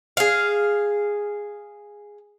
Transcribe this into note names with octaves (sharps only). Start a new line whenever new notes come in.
G#4 F5